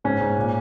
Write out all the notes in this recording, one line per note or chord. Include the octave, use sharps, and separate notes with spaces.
G#2 C#4
G#2
A#2